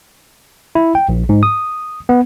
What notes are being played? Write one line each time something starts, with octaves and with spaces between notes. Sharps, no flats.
E4
G5
A#1
G#2
D#6
B3